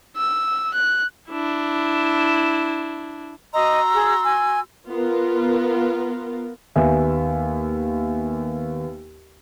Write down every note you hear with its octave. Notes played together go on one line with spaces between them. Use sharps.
E6
F#6
D4 E4
F#4 D#5 A#5 C6 E6
G#4
G#5
B3 F4 A#4
D#2 B3 E5 G#5